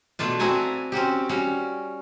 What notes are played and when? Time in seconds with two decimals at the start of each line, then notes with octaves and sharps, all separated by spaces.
0.19 B2 A3 D4 F4
0.39 C4 D4 E4 F#4 G#5 A#5
0.92 C4 C#4 F#4 G4
1.29 G3 C#4 F#4